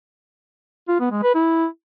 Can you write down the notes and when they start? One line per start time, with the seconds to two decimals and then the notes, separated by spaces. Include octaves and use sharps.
0.88 F4
1.00 B3
1.11 G#3
1.23 B4
1.34 E4